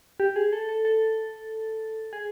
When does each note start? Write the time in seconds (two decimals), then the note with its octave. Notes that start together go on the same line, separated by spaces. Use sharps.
0.20 G4
0.36 G#4
0.53 A4
0.69 A4
0.85 A4
2.13 G#4